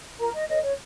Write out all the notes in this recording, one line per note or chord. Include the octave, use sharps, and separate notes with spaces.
F4 A#4 A#5
D#5
A#4 C#5 D#5
C#5